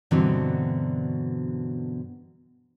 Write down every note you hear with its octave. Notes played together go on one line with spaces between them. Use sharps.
G2 B2 D3 E3 F#3 C4